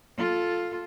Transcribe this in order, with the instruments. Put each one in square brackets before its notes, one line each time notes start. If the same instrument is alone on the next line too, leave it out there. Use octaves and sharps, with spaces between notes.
[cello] F4 A4